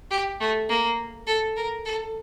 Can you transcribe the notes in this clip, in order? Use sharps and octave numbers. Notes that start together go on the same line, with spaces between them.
G4
A3
A#3
A4
A#4
A4